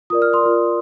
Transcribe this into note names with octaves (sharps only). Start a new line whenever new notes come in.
F4 A#4 D5 D#6
F6
C6 D#6
F4 A#4 D5